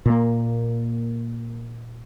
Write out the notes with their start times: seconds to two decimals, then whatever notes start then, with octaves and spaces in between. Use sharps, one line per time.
0.06 A#2 A#3